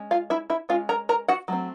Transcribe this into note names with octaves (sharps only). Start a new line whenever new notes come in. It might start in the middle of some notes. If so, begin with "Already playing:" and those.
Already playing: G#3 C#4
F4 F5
E4 E5
E4 E5
G#3 C#4 F4 F5
A#4 A#5
A#4 A#5
F#4 F#5
F#3 A3 C4